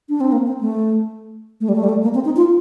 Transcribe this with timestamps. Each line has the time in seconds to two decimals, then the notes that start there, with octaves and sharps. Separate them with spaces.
0.09 D4
0.21 C4
0.32 A#3
0.47 C4
0.61 A3
1.61 A3
1.69 G3
1.75 A3
1.84 G3
1.89 A3
2.03 A#3
2.14 C4
2.25 D#4
2.36 F4